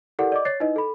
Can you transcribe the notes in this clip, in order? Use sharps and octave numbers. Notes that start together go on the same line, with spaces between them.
E4 G4 A4 A#4 D5 F#5
D5 D#5 D6
C#5 A6 C7
D#4 E4 B4 D#5
A4 B5